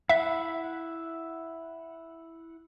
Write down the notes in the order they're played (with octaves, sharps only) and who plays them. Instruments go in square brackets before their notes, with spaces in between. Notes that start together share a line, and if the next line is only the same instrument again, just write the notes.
[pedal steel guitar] E4 F#5 [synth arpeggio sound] E5